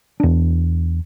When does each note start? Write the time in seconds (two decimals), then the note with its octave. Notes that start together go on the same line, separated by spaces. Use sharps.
0.20 E2 D4